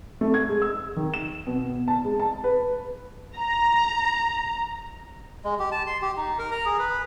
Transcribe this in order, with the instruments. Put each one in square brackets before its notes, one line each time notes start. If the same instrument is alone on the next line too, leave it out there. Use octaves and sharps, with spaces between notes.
[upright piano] A3
G#6
G#3
E6
D#3
E7
B2
A5
G#3
A5
B4
[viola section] A#5
[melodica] G#3
G4
A5
C6
G4
D#4
A#4
A#5
G#4
B4